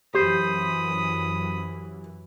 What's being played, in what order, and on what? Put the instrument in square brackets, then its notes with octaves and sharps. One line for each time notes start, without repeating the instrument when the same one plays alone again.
[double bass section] F#2 E3 [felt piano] G4 [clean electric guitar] C5 [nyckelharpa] B5 D#6